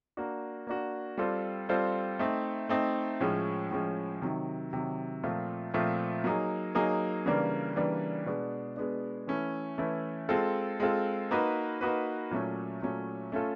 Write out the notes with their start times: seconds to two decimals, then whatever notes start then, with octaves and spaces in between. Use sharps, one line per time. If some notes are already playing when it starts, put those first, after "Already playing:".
0.17 A#3 D4 F#4
0.67 A#3 D4 F#4
1.18 G3 C4 F4 A4 C5
1.69 G3 C4 F4 A4 C5
2.19 A3 C4 D#4
2.69 A3 C4 D#4
3.21 A2 F3 G#3 C#4
3.71 A2 F3 G#3 C#4
4.22 C3 D#3 F#3
4.73 C3 D#3 F#3
5.23 A#2 F3 A3 C4 F4
5.74 A#2 F3 A3 C4 F4
6.24 F#3 A#3 D#4 G#4
6.75 F#3 A#3 D#4 G#4
7.26 C#3 E3 G3 A#3 D4
7.76 C#3 E3 G3 A#3 D4
8.26 B2 G#3 B3 D4
8.77 B2 G#3 B3 D4
9.27 E3 A3 C#4 E4
9.78 E3 A3 C#4 E4
10.29 G#3 C4 F4 A4
10.80 G#3 C4 F4 A4
11.31 A#3 D#4 F#4 B4
11.81 A#3 D#4 F#4 B4
12.31 A#2 F#3 A3 C#4
12.82 A#2 F#3 A3 C#4
13.32 A3 C#4 F4 A4